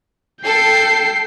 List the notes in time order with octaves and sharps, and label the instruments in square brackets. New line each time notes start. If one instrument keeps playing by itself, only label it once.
[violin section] A4 [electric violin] G5 C7